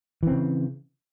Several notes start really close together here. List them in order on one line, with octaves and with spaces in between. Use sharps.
E3 C4 C#3